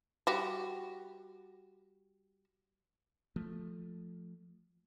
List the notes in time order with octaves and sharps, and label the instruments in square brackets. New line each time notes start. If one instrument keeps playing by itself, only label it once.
[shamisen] G3 F#4 G4
[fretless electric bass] F3 A3